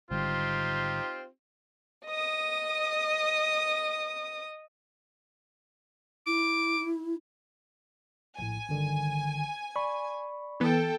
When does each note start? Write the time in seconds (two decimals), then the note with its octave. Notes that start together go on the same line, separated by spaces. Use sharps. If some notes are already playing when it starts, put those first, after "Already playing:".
0.11 G#1 D3 G3 C4 D#4 F4 G4
2.05 D#5 D#6
6.27 E4 D6
8.39 A#1 A2 G#5
8.69 G1 D3 D#3
9.76 D5 B5 C#6
10.60 E3 B3 A4 G5